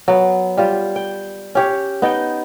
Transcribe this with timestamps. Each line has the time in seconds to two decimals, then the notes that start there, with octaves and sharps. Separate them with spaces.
0.08 F#3 B3
0.57 G3 F4 G4
0.96 G5
1.55 C#4 G4 C#5
2.02 B3 D#4 D#5 G5